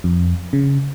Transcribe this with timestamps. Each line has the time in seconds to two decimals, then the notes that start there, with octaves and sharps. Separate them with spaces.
0.04 F2
0.53 C#3